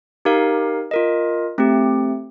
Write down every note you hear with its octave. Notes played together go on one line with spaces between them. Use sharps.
D#4 G4 A#4 F5
F4 A#4 D#5
A3 C4 G4